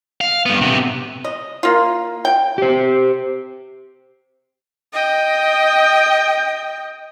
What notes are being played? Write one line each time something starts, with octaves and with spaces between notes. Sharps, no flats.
F5
G2 B3
C3 B3
D#5
A#3 F4
G5
G4 C5
D#5 G5